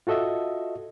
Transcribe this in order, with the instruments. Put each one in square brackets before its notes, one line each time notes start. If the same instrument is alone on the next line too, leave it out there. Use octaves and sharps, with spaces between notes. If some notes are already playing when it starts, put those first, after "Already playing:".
[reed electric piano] F4 F#4 A4 D#5 E5